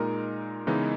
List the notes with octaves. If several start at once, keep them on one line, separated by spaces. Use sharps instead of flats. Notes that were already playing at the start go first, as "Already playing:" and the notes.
Already playing: A#2 G#3 D#4 A#4
C#3 E3 G#3 B3 D#4